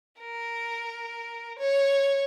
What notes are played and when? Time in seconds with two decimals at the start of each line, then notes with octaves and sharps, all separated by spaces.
0.20 A#4
1.59 C#5